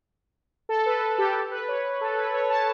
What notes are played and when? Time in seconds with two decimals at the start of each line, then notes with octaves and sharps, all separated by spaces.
0.69 A4
0.86 B4
1.18 G4
1.35 A4
1.51 B4
1.68 C#5
2.01 A4
2.18 B4
2.34 C#5
2.50 A5